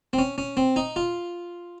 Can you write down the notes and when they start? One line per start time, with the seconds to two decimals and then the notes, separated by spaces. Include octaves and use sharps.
0.13 C4
0.18 C#4
0.38 C#4
0.57 C4
0.76 D#4
0.96 F4